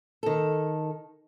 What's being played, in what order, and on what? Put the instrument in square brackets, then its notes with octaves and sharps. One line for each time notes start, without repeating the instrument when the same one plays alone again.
[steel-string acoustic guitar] D#3 A4